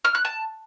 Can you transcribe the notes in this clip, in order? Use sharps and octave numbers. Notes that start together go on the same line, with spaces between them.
F6
F#6
A5